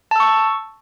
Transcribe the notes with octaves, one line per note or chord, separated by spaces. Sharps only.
A5 C#6 E6